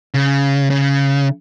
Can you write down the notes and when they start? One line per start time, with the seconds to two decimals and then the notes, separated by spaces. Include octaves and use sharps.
0.14 C#3
0.70 C#3